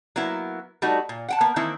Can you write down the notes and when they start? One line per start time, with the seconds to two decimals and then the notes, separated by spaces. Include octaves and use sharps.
0.16 F#3 A#3 B3 E4
0.82 G3 A3 D#4 F#4
1.09 A#2
1.29 F#5 G5 A5
1.41 A#3 B3
1.56 D#3 E3 A#3 C4 E4